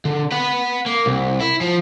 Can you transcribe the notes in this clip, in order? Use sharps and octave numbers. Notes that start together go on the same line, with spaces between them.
D3
B4 F#5
A#3
C2
E4
F3